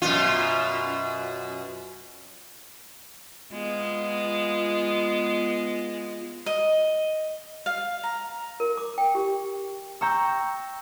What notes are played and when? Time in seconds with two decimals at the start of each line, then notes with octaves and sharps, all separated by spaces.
0.02 F#2 B2 F4
3.52 G#3 B3 F4
6.46 D#5
7.66 F5
8.03 A#5
8.60 A#4
8.77 D6
8.98 G5
9.15 G4
10.01 G5 A#5 C#6 E6